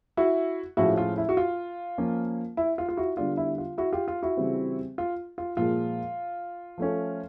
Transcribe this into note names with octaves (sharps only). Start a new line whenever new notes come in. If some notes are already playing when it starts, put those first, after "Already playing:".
E4 F#4
A2 F3 G#3 C#4 E4 F#4
F4
E4
F#4
F4
F3 A#3 C#4
E4
F4
F4
E4 F#4
D3 G3 B3 D4 F4
E4
F4
E4 F#4
F4 G4
F4
E4 F#4
C#3 E3 G3 C4
F4
F4
A#2 F3 G#3 F4
F3 A3 C#4